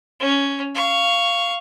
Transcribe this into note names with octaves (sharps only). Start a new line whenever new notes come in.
C#4
F5 C#6